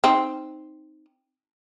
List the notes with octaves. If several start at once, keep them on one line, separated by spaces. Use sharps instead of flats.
C4 D#4